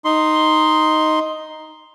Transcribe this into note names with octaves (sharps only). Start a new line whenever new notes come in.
D#4 C6